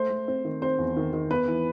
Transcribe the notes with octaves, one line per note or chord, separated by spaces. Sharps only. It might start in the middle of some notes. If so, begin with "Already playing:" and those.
Already playing: A3 C5
A3
C4
D#3
C4 C5
E2
D#3
D#3
B3 B4
E3